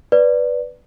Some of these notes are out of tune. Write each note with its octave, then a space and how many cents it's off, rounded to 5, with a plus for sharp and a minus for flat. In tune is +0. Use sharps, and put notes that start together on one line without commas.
B4 +0 D5 +0